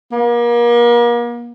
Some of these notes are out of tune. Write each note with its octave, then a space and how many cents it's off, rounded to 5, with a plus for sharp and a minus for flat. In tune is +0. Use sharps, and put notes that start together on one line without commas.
A#3 +35